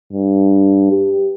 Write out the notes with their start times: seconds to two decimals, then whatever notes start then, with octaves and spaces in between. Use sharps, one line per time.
0.13 G2
0.92 G4